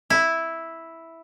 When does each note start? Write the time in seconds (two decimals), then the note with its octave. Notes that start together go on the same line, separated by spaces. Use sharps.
0.10 E4